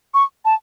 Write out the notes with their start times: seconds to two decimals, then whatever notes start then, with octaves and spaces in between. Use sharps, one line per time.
0.14 C#6
0.45 A5